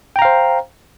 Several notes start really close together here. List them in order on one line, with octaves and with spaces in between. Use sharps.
G5 A#5 F5 C5